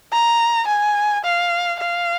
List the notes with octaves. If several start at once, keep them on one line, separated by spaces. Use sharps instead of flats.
A#5
G#5
F5
F5